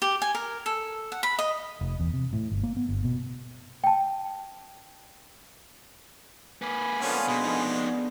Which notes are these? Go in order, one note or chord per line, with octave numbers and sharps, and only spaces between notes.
G4
G#5
A#4
A4
F#5
B5
D#5
F1
E2
C3
A2
G1
A#3
B3
G1
B2
G5 A5
A#3 B4 G#5 B5
D3 F3 B3 C#4 F4
B2 G#3
F2 B2 D3 C#4 D#4